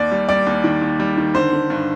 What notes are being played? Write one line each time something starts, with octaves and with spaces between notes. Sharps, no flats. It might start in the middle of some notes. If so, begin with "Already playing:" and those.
Already playing: D#2 D5
G3
G3 D5
D#2
D#3
D#2
G3
D#3
D3 C5
D3
G2